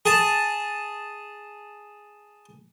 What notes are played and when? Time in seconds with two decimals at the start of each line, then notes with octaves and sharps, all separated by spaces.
0.05 G#4 A5